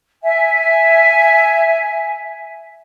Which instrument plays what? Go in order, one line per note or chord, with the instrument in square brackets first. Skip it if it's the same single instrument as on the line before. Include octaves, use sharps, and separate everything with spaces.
[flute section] E5 G#5